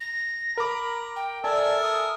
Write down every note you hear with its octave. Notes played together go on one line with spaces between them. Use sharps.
A#6
A#4 A#5 B5 D6
G5
A4 A#4 D5 E5 G#5 A5
D#6